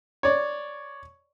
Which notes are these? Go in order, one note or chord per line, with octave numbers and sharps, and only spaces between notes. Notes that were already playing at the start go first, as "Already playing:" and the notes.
C#5 D5